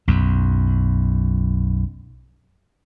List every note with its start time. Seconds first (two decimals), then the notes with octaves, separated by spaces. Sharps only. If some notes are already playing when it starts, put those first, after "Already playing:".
0.08 B1 F#2